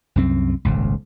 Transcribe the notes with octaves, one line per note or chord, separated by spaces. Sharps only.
C2 F#2 C4
D#1 G#1 C#2